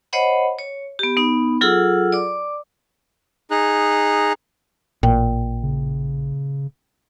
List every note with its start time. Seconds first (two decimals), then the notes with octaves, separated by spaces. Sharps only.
0.13 C5 C#5 D#5 F#5 B5
0.59 C#5
0.99 B3 G4
1.17 B3 D#4
1.61 F#3 F4 G#4 A4 F#5 E6
2.12 D5 D6
3.51 D#4 G#4 A#5 F#6
5.03 A1 A#2 G5
5.63 C#3